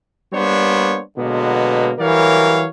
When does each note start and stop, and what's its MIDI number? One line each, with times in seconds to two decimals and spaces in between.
0.33 1.00 55
0.33 1.00 58
0.33 1.00 59
0.33 1.00 62
0.33 1.00 72
0.33 1.00 73
1.17 1.92 47
1.17 1.92 50
1.17 1.92 54
1.17 1.92 56
1.17 1.92 58
1.17 1.92 59
1.98 2.67 52
1.98 2.67 54
1.98 2.67 55
1.98 2.67 70
1.98 2.67 73
1.98 2.67 77